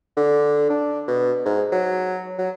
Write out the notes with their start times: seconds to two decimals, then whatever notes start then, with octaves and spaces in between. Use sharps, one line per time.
0.17 D3
0.70 D4
1.08 B2
1.45 G#2
1.72 F#3
2.38 F#3